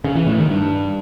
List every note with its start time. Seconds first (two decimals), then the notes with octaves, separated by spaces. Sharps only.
0.04 C#3
0.16 E3
0.27 A2
0.38 D#3
0.49 G2